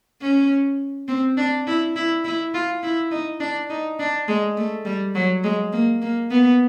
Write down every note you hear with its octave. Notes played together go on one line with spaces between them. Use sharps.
C#4
C4
D4
E4
E4
E4
F4
E4
D#4
D4
D#4
D4
G#3
A3
G3
F#3
G#3
A#3
A#3
B3